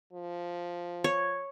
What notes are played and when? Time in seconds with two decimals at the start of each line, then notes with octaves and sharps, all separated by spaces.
0.13 F3
1.04 C#5